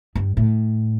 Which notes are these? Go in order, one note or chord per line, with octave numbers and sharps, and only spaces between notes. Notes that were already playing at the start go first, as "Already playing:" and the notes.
G2
A2